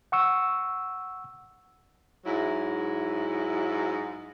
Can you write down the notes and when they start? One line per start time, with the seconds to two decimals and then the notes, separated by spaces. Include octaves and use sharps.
0.12 F#5 C#6 E6
2.25 G#2 F#3 E4